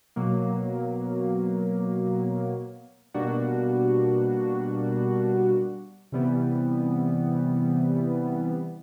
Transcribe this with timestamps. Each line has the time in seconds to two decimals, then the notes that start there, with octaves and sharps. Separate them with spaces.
0.16 B2 F#3 A#3
3.14 B2 G3 A#3 D4 F#4
6.12 C3 E3 G3 B3